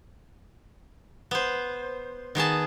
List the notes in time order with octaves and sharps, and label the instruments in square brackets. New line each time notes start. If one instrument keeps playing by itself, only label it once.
[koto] B3 C5
D#3 B3 G#4 A5